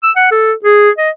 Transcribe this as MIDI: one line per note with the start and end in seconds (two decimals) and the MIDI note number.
0.04 0.11 88
0.16 0.30 78
0.31 0.53 69
0.65 0.90 68
0.98 1.10 75